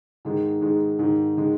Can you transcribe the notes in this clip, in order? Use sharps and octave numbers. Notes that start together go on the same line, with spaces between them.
G#2 D#3 G#3
G#2 D#3 G#3
G#2 D#3 G#3
D#3 G#3